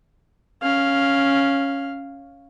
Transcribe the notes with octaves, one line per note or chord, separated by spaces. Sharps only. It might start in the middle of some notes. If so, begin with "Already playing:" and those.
C#4 F5